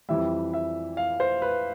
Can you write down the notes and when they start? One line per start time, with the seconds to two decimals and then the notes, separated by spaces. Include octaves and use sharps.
0.09 F2 E3 G3 E5
0.54 E5
0.97 F5
1.20 C5
1.42 B4